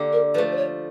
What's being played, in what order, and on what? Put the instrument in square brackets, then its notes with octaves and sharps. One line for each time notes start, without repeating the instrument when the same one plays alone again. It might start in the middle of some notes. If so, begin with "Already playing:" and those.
Already playing: [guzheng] D3 A#3 G4
[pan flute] A#4
[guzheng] F3 [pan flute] B4
[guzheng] A3
[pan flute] C5
C#5